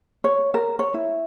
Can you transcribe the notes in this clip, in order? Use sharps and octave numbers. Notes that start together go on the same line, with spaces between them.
C#5
A#4
C#5
E4